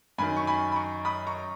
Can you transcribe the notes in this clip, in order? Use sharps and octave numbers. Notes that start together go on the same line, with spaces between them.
F#2 D#3 G#5 B5
C#6
G#5 B5
B5
A#5 C#6
B5 D#6
A#5 C#6